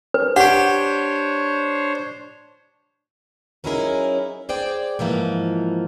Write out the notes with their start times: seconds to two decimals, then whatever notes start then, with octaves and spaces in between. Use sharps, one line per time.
0.14 B4
0.36 D4 G4 C5 C#5 F#5 G5
3.64 F#3 C#4 D#4 E4 G#4 A#4
4.49 G#4 C5 D5 G5
4.99 G#2 E3 F3 A#3